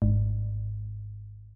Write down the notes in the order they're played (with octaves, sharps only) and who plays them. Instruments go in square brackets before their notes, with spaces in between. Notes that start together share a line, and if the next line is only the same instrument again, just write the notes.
[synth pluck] G#1 G#2